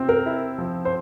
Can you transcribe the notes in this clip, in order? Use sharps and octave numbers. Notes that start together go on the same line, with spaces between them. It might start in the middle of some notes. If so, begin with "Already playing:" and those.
Already playing: C3 C4
A#4
E4
F3
C5